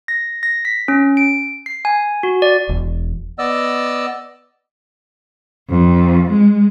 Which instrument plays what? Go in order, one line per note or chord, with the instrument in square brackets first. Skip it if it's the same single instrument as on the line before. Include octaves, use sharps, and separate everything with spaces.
[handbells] A#6
A#6
B6
C#4
D7
C7
G#5
F#4
D5
[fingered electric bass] E1
[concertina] B3 D5 D#5 E6
[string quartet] F2
G#3